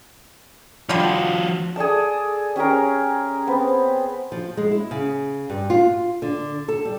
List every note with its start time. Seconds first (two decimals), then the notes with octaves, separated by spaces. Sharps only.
0.89 D3 F3 G3 F4 F#4
1.76 G#4 A4 D5 A5
2.56 C#4 G4 G#4 A#4
3.47 B3 C4
4.32 F3
4.57 G#3
4.71 E4
4.91 C#3
5.50 G2
5.70 F4
6.22 D3
6.68 A4
6.85 G3